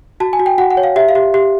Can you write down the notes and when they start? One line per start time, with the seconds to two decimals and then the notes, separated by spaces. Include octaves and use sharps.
0.20 F#4 A5
0.33 G#5
0.40 F#4
0.46 G5
0.58 F#4 F#5
0.71 F#5
0.77 C#5
0.83 F5
0.96 G4 E5
1.09 F5
1.15 G4
1.34 G4